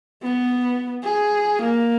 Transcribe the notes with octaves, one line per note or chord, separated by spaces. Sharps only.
B3
G#4
A#3